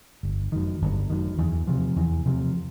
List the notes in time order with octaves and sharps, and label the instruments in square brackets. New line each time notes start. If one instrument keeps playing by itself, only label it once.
[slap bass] G1
F#2 D#3
G1
F#2 D#3
E2
C3 F3
E2
C3 F3